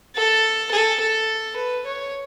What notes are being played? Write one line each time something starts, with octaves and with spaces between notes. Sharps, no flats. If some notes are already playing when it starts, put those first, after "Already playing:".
A4
A4
A4
B4
C#5